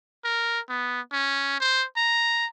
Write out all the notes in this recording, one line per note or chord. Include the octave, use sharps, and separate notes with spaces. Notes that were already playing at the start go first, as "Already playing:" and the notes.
A#4
B3
C#4
C5
A#5